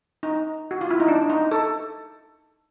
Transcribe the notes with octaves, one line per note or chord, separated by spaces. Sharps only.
D#4
F#4
F4
E4
D#4
D4
D#4
A4